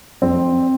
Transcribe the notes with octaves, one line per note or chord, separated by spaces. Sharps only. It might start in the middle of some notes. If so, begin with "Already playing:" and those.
F2 C4